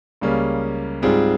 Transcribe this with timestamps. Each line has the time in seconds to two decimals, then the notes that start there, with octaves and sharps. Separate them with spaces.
0.21 C#2 C#3 G3 A#3 C#4
1.02 G#2 G3 C4 F4 G#4